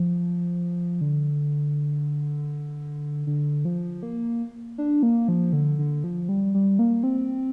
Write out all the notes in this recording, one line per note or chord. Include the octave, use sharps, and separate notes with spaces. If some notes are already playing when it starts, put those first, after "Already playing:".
Already playing: F3
D3
D3
F3
A#3
D4
A#3
F3
D3
D3
F3
G3
G3
A#3
C4